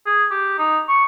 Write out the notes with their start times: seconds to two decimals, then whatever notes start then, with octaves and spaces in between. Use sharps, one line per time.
0.06 G#4
0.31 G4
0.59 D#4
0.88 C#6